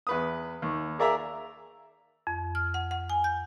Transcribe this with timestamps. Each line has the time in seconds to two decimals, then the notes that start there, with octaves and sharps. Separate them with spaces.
0.07 E2 B4 D#6
0.62 D#2
0.99 G#4 A#4 D5 E5 F5 A#5
2.27 F2
2.55 F6
2.74 F#5
2.91 F#5
3.10 G#5
3.24 G6